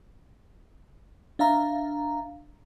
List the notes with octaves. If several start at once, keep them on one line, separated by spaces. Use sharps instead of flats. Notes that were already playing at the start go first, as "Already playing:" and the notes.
D4 E5 F5 A#5